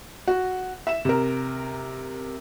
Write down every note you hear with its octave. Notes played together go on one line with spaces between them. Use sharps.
F#4
E5 E7
C3 A#4